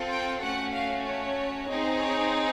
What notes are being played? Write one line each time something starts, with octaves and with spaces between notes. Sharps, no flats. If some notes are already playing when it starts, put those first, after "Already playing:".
Already playing: C4 F4 A4
G5
A3 C#4 F#4 F#5
F5
C#5
C4 D#4 G#4
C#5